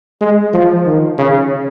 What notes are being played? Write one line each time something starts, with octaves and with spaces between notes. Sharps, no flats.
G#3
F3
D#3
C#3